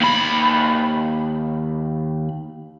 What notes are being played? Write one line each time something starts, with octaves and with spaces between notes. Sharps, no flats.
D#2 B5